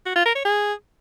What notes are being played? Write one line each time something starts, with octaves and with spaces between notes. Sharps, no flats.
F#4
F4
A#4
C#5
G#4